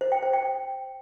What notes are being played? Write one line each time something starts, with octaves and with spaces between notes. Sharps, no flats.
C5
G5
C5
G5